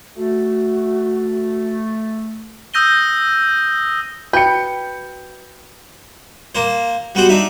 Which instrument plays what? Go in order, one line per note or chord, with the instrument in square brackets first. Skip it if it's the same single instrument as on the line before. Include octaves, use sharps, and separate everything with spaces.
[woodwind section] A3 [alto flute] F#4
[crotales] D#6 E6 G6 A#6 D#7 G7
[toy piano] F#4 G5 [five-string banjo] B4 [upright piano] G6 C#7
[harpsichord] A#3 C5
G3 B3 F#4 C5
D4 D#4 E5